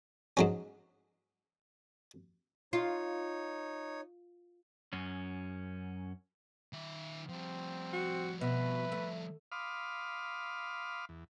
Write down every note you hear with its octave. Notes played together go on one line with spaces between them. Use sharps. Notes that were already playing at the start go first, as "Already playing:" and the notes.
G#2 F#3 C#4
D#4 F4 C#5
F#2 C#4
D#3 E5
F3 G3 C4
F#4
B2 B4 E5
A3
F5 B5 C6 D6 D#6 F6
E2